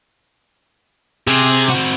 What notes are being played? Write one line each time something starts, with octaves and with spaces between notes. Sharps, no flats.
C3 G#4
C4 F#4